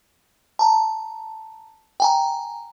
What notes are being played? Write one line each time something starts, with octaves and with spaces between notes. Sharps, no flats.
A5 A#5
G5 G#5 A#5